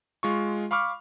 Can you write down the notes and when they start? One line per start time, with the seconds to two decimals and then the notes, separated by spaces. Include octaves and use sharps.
0.23 G#3 F4 C#6
0.71 F5 B5 C#6 D6 F6